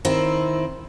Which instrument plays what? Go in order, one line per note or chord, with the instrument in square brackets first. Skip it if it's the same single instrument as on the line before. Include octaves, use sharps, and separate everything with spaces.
[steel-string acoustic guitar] D#3 C4 E4